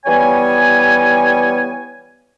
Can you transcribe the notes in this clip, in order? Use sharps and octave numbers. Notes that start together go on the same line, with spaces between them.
E3 G3 B3 C#5 G#5